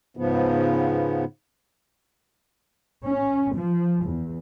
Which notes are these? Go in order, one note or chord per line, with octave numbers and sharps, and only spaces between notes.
G#2 C#3 F3 B3
C#4
F3
E2